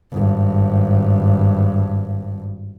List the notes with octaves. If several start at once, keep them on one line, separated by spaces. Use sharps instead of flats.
G#1 G2